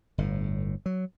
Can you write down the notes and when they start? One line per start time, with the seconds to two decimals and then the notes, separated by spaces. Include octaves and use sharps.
0.18 G1 A2
0.86 F#3